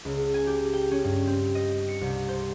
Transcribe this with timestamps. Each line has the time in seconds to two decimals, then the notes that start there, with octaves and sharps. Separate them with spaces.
0.05 C#2
0.34 G#5
0.47 G4
0.73 G5
0.91 C#4
1.04 G2
1.27 C4
1.55 D#5
1.89 C#7
2.01 C2
2.29 C5